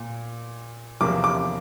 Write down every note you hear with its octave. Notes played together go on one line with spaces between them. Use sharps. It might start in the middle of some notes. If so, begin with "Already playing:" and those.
Already playing: A#2
E2 C3 F3 A#3 D6
D6